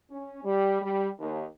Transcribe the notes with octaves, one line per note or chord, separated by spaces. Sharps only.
C#4
G3
G3
D#2